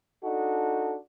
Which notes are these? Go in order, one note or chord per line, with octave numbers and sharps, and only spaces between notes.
D4 D#4 F#4 A4